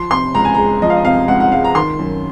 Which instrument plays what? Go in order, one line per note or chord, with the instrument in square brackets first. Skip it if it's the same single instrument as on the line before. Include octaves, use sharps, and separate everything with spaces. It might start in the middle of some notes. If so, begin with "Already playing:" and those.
Already playing: [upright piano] F3 C6
C3 C6
C#2 A#5
G#5
G#3 A#5
F3 D#5
F5
D#5
C3 F5
C#2 F#5
F#5
G#3 F5
A#5
D#3 C6
F#2